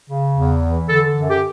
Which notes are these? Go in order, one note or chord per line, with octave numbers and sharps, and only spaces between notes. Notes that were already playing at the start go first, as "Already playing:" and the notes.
C#3
E2
E3
D3 A4
F#2
G4